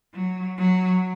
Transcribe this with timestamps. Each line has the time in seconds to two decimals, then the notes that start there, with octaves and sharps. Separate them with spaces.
0.14 F#3
0.57 F#3